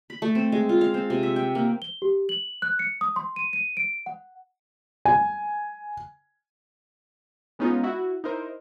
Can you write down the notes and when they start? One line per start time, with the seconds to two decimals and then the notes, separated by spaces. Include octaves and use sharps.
0.10 B5
0.22 A3
0.35 C4
0.52 G#3
0.69 F4
0.81 F5
0.94 C4
1.10 C3
1.23 E5
1.36 G5
1.55 A#3
1.82 G7
2.02 G4
2.29 F#7
2.62 F#6
2.79 C#7
3.01 D#6
3.16 C6
3.36 D#7
3.53 D#7
3.77 D7
4.06 F#5
5.05 G#5
7.59 G#3 B3 C#4 D#4 F4
7.83 E4 F#4
8.24 D#4 E4 A#4 C5